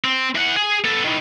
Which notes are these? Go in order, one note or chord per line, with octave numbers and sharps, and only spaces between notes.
C4
E3 F#5
G#4
B3 A4
D#3 E3